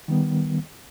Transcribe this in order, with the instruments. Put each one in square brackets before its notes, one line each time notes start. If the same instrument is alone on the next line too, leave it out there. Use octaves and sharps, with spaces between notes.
[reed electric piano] D#3 G3 B3